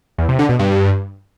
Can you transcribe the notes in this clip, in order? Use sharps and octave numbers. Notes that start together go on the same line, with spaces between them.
E2
C3
D3
B2
G2